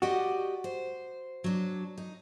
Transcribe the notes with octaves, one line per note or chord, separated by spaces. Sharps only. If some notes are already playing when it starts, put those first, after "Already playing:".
F#4 G4 D5 D#5
C5
F#3 D4
D#4